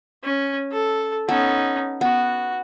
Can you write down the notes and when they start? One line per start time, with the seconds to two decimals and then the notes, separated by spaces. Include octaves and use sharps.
0.24 C#4
0.72 A4
1.29 B3 C#4 D#4 A4
2.01 B3 F#4